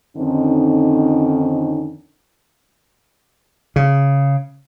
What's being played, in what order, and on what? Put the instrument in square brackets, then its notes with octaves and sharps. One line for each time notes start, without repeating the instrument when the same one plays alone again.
[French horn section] F2 D3 D#3 C4 C#4 D#4
[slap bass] C#3